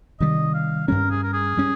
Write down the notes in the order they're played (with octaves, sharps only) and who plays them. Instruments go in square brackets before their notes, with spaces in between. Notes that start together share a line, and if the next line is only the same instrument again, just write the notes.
[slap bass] C3 D#3 G3 [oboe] D#5
[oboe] F5
[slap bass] G2 G3 C#4 [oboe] A#4
[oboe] G#4
A#4
G#4
[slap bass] G3 C#4